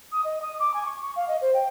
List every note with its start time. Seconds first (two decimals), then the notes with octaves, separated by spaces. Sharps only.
0.12 D#6
0.24 D#5
0.42 D#6
0.59 D6
0.74 G#5
0.85 C#6
1.01 C#6
1.16 F5
1.28 D#5
1.42 C5
1.54 G5